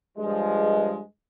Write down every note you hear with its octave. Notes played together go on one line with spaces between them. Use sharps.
G2 F3 G#3